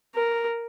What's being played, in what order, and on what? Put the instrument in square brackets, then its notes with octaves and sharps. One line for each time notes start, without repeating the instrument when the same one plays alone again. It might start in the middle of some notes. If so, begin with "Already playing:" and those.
[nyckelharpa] A#4